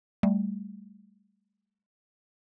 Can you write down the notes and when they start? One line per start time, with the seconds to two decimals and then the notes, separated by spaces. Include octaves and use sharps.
0.23 G3 A3